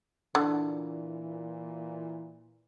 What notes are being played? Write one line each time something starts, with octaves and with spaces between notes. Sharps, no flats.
A#2 D3 E3